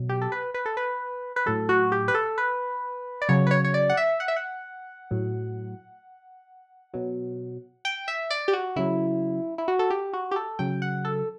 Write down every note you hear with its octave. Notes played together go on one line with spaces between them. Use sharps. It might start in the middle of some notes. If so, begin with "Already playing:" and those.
Already playing: B2 F#3
G4
A4
B4
B4
A4
B4
B4
A2 F#3 A4
F#4
G4
B4
A4
B4
D5
C#3 F#3 C#5
B4
C#5
C#5
D5
F#5
E5
F#5
E5
F#5
A2 F#3
B2 F#3
G5
E5
D5
G4
F#4
C#3 F#3 E4
E4
F#4
A4
G4
F#4
G4
A4
C#3 F#3 G5
F#5
A4